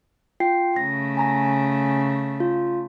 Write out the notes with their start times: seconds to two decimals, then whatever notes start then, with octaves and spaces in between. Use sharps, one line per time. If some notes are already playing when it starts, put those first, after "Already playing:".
0.40 F4 G5 C7
0.76 C#3 A3 A#6
1.17 G#5 A#5 A#6
2.40 F4